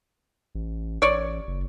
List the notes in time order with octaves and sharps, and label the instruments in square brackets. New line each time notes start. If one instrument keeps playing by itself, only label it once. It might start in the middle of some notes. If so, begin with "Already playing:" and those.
[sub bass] A1
[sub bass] A1 [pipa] C#5 D5
[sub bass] F#1